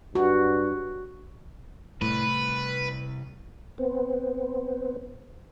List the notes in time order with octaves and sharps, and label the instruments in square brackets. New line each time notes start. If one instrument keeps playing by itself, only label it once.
[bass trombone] G2 [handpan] F#4
[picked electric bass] A2 [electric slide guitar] C3 G3 [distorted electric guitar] B4
[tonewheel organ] B3 C4